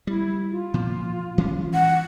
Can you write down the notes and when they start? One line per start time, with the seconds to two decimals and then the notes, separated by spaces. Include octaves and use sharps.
0.07 G3 E4
0.51 F4
0.74 A#2 F3
1.38 E3 G#3 C#4
1.74 F#5